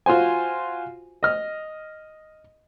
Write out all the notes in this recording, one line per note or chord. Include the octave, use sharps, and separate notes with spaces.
F4 F#4 C5 G#5
D#5 F6